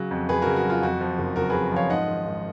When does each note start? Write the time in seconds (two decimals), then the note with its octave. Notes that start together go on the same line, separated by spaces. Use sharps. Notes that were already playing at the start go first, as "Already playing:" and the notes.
Already playing: C#3 F#3
0.11 F2
0.28 F2 G#4 B4
0.42 C#3 F#4 A#4
0.56 F#4
0.64 F#3
0.70 F4
0.82 F2 F#4
1.01 F3
1.18 F#1
1.36 F#1 F#4 A#4
1.50 F2 G#4 B4
1.72 F3 C#5 F5
1.89 G#2 D#5 F#5
2.08 D#3
2.25 G#1